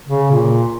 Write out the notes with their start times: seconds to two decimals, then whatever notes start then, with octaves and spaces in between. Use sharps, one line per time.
0.08 C#3
0.32 A#2